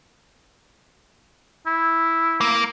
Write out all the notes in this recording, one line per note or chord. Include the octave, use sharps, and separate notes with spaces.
E4
A#3